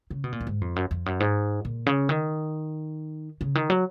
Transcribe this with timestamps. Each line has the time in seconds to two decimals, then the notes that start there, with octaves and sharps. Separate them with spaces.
0.10 C#3
0.24 B2
0.32 A#2
0.41 F#2
0.47 G#2
0.61 F2
0.76 F#2
0.91 F2
1.06 F#2
1.20 G#2
1.65 A#2
1.86 C#3
2.09 D#3
3.41 C#3
3.55 D#3
3.70 F#3